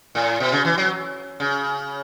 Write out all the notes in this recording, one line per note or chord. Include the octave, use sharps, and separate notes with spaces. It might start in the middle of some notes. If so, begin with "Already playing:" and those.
A2
B2
C#3
E3
F#3
C#3